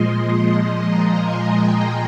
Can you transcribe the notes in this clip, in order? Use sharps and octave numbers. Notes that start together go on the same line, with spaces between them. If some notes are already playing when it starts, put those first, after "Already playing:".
Already playing: A#2 F3 G#3 D#5 C6
A#5
G#5
G5